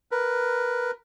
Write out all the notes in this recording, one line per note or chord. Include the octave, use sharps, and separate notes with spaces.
A#4 B4